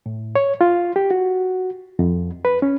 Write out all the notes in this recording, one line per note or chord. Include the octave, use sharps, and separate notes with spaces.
A2
C#5
F4
G4
F#4
F2
B4
C#4